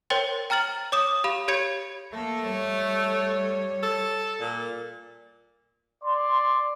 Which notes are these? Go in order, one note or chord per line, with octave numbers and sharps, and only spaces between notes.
A#4 C5 C#5 G5 C6 A6
G5 A#5 F6 A6 F#7
C#5 D6 D#6 E7
G4 F5 B5 E7
G4 C#5 B5 G#6 C#7
A3 A#3 A4
G3 C#5
A4
A#2
D5 C6